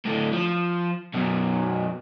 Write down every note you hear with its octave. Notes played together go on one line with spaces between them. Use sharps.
A2 D3
F3
F#2 B2